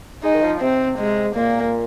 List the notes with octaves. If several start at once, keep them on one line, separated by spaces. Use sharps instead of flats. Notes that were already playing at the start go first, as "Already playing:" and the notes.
G#3 D#4
D#3
F3
C3 C4
G#3
A#2 A#3